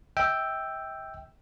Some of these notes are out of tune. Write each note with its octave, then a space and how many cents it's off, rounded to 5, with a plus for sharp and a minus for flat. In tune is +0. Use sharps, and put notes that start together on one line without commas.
E5 -45 G5 +0 E6 +5